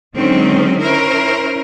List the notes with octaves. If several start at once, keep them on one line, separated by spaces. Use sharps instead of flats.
D3 D#3 F#3 G#3 C4 C#4
C#4 E4 A#4 C5